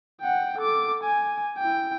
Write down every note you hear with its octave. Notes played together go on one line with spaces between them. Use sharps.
F#5 G5
A4 D6
G#5
E4 G5